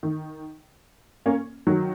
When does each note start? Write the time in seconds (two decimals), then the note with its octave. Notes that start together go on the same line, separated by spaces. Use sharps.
0.03 D#3
1.26 A#3 C#4
1.67 D#3 F#3